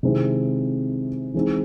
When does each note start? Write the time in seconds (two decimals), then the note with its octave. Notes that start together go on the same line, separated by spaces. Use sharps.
0.03 C3 D#3 G#3 C4 E4
1.34 E3 G#3 C4 D#4 G#4